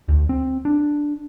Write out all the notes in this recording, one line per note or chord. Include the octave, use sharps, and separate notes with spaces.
D2
C4
D4